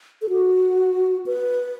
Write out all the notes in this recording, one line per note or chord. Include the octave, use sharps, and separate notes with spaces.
A4
F#4
B4